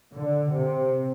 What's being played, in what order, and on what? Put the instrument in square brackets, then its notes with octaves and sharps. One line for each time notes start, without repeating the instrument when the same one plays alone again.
[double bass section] D3
C3